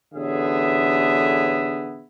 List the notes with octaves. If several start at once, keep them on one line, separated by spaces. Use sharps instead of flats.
A1 D3 B3 G#4 E5